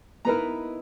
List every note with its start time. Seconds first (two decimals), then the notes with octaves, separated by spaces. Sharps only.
0.25 B3 D#4 E4 A#4 B4 A#5